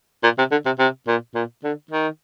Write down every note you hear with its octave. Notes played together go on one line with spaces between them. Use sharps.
A#2
C3
D3
C3
C3
A#2
A#2
D3
D#3